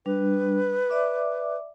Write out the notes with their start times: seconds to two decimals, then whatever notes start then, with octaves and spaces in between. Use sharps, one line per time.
0.06 G3 D4 B4
0.90 D5 E5 D6